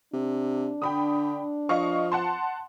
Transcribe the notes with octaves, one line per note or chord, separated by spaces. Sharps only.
C3 D4
D3 G5 B5 D#6
F3 D#5 F5 C#6
F#5 A5 C6